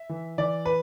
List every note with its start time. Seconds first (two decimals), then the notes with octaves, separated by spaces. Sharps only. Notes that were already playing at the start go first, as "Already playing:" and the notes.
Already playing: E5
0.09 E3
0.38 E3 D5
0.66 B4